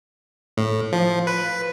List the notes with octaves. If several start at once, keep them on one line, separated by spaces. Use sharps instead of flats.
A2
F3
B4